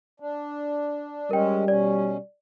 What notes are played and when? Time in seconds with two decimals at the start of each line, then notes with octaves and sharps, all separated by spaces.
0.20 D4
1.31 G3 G#3 C#4 A#4 G5
1.68 B2 C#4 D5